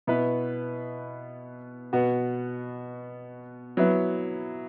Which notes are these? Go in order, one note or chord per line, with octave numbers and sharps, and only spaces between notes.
B2 B3 E4 B4
B2 B3 F#4
F#3 B3 E4